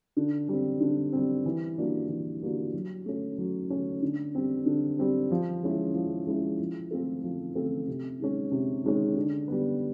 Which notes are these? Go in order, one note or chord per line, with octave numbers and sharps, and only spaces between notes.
D3
G3 C4
D3
G3 C4
E3
G3 A#3 D4 F#4
E3
G3 A#3 D4 F#4
F#3
A3 C#4
F#3
A3 C#4
D3
G3 C4
D3
G3 C4
F3
G#3 C#4 E4
F3
G#3 C#4 E4
F3
A3 C4 F4 A4
F3
A3 C4 F4 A4
C3
D#3 G#3 C#4
C3
D#3 G#3 C#4
D3
G3 B3